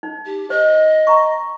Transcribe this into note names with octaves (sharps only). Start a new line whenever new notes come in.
D#4
G4
C5 D#5
A#5 C#6